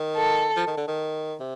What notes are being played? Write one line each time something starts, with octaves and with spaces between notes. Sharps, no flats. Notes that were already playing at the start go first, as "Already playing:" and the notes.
Already playing: D#3
A4
F3
D#3
D3
D#3
C3